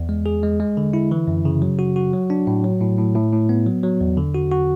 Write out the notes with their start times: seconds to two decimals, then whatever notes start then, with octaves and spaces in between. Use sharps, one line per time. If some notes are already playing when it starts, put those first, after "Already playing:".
Already playing: E2
0.09 G#3
0.26 G#4
0.43 G#3
0.60 G#3
0.77 D3
0.93 E4
1.11 E3
1.27 F#2
1.45 C#3
1.62 F#3
1.79 F#4
1.96 F#4
2.13 F#3
2.30 D4
2.47 A2
2.64 F#3
2.81 A2
2.98 A2
3.15 A2
3.32 A2
3.49 B3
3.66 F#3
3.83 F#3
4.01 E2
4.17 D3
4.34 F#4
4.51 F#4